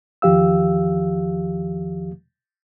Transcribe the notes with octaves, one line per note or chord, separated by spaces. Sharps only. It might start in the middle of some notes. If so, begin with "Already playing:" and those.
E2 D#3 F3 G4 F5 E6